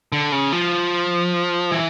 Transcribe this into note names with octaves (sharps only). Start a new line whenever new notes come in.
D3
C#3
F3
E3